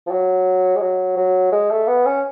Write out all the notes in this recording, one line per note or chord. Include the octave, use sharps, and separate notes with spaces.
F3
F#3
G#3
F#3
F#3
G#3
A3
B3
C#4